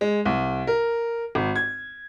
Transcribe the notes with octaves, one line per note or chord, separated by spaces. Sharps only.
G#3
C2
A#4
G#1
G#6